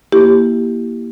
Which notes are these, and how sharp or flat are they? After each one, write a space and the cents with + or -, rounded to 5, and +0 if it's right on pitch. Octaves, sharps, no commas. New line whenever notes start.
A#3 +15 E4 +5 G4 +0